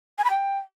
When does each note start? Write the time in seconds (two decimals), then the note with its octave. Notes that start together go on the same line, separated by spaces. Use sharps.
0.18 G#5
0.24 B5
0.30 G5